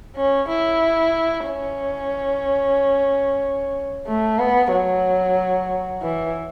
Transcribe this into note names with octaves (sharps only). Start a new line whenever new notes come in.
C#4
E4
C#4
A3
B3
F#3
E3